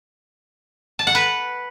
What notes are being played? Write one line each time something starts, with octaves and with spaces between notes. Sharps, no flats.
A5
F#5
B4